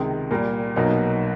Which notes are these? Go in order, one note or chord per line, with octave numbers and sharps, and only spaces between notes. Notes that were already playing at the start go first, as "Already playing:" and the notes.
Already playing: C#2 C3 D#3 G#3
A#2 G3 A#3
B1 B2 F#3 A#3 D#4